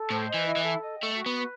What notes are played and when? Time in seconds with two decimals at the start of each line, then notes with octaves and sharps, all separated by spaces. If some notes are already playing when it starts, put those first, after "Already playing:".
Already playing: A4
0.10 A2 C5
0.27 D#5
0.34 E3
0.45 E4
0.56 E3
0.63 A4
0.80 D#5
0.97 G5
1.03 A3
1.15 F#4
1.26 B3
1.33 B4